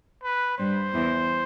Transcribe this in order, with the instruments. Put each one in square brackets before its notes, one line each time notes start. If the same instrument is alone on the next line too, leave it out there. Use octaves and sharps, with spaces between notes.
[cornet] B4
[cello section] G2 G3 [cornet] C5
[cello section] E2 E3